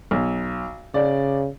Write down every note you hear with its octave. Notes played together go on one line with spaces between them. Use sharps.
B1
C#3 D5